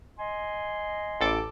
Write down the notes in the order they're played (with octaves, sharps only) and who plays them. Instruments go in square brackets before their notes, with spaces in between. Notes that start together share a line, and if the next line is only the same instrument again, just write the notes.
[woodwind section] D#5 G#5 C6
[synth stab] A1 A4 D6